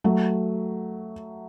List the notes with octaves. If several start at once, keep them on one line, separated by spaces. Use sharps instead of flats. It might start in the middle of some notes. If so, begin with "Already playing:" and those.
F#3 A3